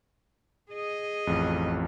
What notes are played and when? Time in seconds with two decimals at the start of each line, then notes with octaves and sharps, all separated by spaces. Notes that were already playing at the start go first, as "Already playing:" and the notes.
0.71 G#4 D#5
1.27 A1 F2